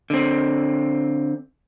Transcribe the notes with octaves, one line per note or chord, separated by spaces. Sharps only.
D3 C4